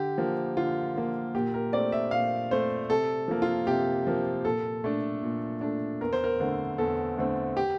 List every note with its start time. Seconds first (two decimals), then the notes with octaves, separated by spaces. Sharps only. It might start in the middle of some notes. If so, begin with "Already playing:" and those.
Already playing: D3 G4
0.18 F3 A#3
0.57 D3 F4
0.96 F3 A#3
1.35 A#2 G4
1.54 A#4
1.73 A3 C4 D5
1.92 E5
2.11 A#2 F5
2.51 A3 C4 C5
2.90 C3 A4
3.28 F3 A#3
3.42 F4
3.67 C3 G4
4.07 F3 A#3
4.45 A#2 A4
4.84 A3 D4
5.23 A#2
5.61 A3 D4
6.01 E2 A#4
6.13 C5
6.24 A#4
6.40 D3 A3 C4
6.78 E2 A4
7.17 D3 A3 C4
7.57 G4